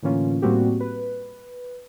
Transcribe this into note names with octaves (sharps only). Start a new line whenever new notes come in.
A2 D3 E3 A#3 C#4 F4
A2 G3 A#3 C4 F#4 G4
B4